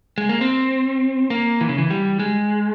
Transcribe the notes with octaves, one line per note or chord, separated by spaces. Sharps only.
G#3
A#3
C4
A#3
E3
C#3
E3
G3
G#3